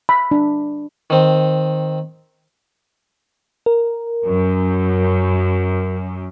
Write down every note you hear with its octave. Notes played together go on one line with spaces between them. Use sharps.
B5
D4
D#3 C4
A#4
F#2